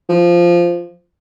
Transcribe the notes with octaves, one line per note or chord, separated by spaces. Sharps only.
F3